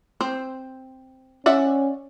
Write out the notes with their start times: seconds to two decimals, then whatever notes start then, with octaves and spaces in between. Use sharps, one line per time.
0.21 C4 C5
1.46 C#4 D5 E5 F#5